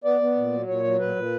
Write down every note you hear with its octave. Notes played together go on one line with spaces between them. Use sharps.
B3 D5
B3
A#2
F#3
A#2 C#5
F#3
A#2 B4
A#2